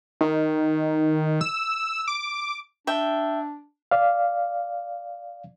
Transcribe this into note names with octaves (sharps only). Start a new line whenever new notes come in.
D#3
E6
D6
D4 E5 G5
D5 F5